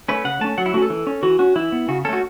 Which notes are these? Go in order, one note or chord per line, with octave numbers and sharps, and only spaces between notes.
A3 C#4 B4
C#3 F#5
A3 C#4 A5
F#3 F#5
E4
A3 C#4 F#4
A4
E3
C#4
E3 F#4
C#4 F#4
E3 E4
B3
C#3 F#4
A3 C#4 F#4 A4